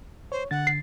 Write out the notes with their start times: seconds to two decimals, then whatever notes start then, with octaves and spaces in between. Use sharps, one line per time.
0.32 C5 C#5
0.51 D3 F#5 A6
0.67 C7